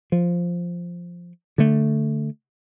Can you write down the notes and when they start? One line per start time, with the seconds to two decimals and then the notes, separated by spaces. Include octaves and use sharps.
0.12 F3
1.58 D3 A3